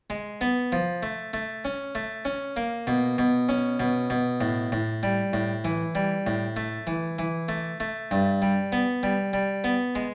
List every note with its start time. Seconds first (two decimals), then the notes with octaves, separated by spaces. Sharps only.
0.10 G#3
0.41 B3
0.72 F3
1.03 A3
1.34 A3
1.65 C#4
1.95 A3
2.25 C#4
2.57 A#3
2.87 B2
3.18 B2
3.49 C#4
3.80 B2
4.10 B2
4.41 A2
4.72 A2
5.03 G3
5.33 A2
5.65 E3
5.95 G3
6.27 A2
6.56 A3
6.87 E3
7.19 E3
7.49 A3
7.80 A3
8.11 G2
8.42 G3
8.72 B3
9.03 G3
9.33 G3
9.64 B3
9.95 G#3